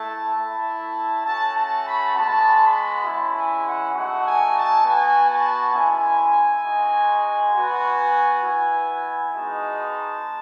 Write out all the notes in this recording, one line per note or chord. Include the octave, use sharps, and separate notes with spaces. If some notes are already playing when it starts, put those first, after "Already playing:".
Already playing: A3 E4 A5
A3 E4
A3 C#4 F#4 A5
A5
B5
G#3 B3 F#4 A5
B5
G#3 C#4 E4 A5
G#5
F#5
A3 D#4 F#4 F#5
G#5
A5
B3 F#4 G#5
A5
G#3 C#4 E4 G#5
G#3 D#4 F#4
B3 F#4
B3 E4
G#3 B3 D#4 F#4 A5